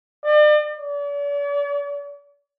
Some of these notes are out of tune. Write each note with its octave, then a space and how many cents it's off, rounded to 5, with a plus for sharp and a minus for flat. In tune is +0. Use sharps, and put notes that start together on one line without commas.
D5 +40
D5 -45